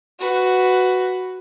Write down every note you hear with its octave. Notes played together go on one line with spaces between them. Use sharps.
F#4 B4